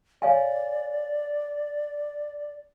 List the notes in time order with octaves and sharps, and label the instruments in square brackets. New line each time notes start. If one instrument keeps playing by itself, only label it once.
[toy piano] C#5 F5 G#5 [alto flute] D5